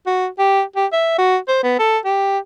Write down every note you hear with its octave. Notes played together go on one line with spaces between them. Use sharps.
F#4
G4
G4
E5
F#4
C5
B3
A4
G4